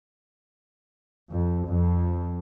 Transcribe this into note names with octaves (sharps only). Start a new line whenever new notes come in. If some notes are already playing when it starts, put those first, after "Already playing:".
F2
F2